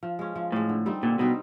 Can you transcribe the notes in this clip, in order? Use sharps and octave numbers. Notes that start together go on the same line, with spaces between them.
F3
G#3 C#4
F3
A2 G#3 C#4
D3
G3 C4 D#4
A#2 D3
B2 G3 C4 D#4